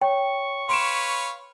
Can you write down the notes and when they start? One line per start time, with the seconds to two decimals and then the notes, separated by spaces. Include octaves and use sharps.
0.01 C#5 G5 C#6
0.69 B4 C#5 F5 C6 D7 E7